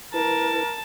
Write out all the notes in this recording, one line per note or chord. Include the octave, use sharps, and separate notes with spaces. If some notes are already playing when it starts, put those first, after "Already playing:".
E4 A#4 B4 A5